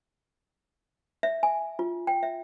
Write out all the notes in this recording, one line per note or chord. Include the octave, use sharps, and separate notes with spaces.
E5
G#5
F4
G5
E5